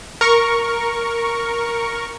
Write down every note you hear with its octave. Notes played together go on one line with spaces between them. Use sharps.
A#4 C#6